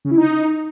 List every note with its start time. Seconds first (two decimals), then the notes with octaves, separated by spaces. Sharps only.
0.05 C#3
0.11 E4
0.17 D#4